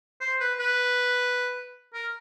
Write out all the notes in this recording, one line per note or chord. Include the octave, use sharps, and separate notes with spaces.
C5
B4
B4
A#4